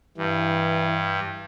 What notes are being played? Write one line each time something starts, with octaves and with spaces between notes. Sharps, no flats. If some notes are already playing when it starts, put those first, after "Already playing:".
G2 E3